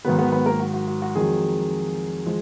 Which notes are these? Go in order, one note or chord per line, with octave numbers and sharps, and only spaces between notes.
G#2 D#3 F#3 B3 B4
B3 B4
B3 B4
A#3 A#4
F#4
F#4
F#4
F#4
F2 D#3 F#3 G#3 G#4
F3 G#3